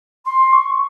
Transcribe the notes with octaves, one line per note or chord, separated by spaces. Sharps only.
C6
C#6